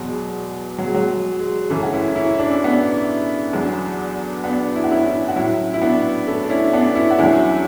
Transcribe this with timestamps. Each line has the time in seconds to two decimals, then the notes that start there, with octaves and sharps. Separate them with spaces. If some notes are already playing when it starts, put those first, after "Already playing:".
Already playing: E2 B2 F#3 G#3
0.78 F#3
0.86 G#3
0.94 F#3
1.09 G#3
1.39 G#3
1.70 F#2 C#3 E3 A3 C#4
1.83 F#4
1.92 C#4 E4
2.16 C#4 E4
2.39 D4
2.51 C#4
2.64 B3 D4
3.53 E2 D3 F#3
4.44 B3 D4
4.75 E4
4.84 F#4
4.92 C#4 E4
5.05 C#4 E4
5.28 F#4
5.36 A2 F#3 C#4 E4
5.74 E4
5.82 B3 D4
6.27 A3 C#4
6.43 D4
6.50 C#4 E4
6.73 B3 D4
6.95 C#4 E4
7.10 F#4
7.18 E2 D3 F#3 C#4 E4